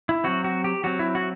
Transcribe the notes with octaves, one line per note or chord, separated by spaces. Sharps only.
E4
F#3 C4 F#4
F#4
G4
F#3 C4 F#4
E4
F#4